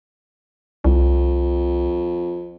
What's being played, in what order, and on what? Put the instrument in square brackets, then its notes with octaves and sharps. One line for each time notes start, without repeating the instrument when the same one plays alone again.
[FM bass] C2 [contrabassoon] F2